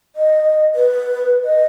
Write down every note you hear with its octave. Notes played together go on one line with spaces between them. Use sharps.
D#5
B4
D#5